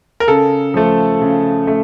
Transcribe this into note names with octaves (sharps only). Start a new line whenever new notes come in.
A#4
C#3 A4
F3 A3
C#3
A3